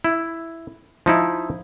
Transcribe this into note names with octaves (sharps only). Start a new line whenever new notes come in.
E4
F3 D#4 E4